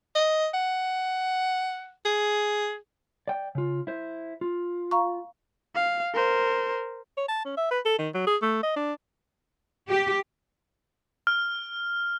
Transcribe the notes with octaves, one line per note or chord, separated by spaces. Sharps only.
D#5
F#5
G#4
D5 G5
C#3 F4
E4 C5
F4
F5 A#5 C#6
F5
A#4 C5
C#5
A5
C#4
E5
B4
A4
D#3
F#3
G#4
A3
D#5
D4
G4
F6